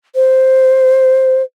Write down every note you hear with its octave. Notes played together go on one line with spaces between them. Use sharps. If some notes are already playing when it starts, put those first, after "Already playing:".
C5